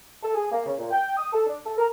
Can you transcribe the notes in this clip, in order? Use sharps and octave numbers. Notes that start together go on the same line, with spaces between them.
A4
G#4
A#3
C#3
A#2
G5
D#6
A4
D4
A4
A#4